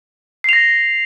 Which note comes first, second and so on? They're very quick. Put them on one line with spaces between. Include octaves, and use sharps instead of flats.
C7 F7 A#6